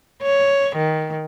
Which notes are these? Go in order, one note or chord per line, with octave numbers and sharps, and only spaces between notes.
C#5
D#3